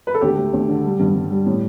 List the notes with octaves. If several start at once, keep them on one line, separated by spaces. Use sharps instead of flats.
B4
A4
D2 G4
A3
D2
D3
G3
G2
G2
G3
A2